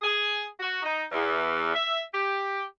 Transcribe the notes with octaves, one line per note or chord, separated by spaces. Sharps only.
G#4
F#4
D#4
E2
E5
G4